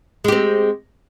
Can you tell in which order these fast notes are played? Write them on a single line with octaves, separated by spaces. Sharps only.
G#3 G4 C4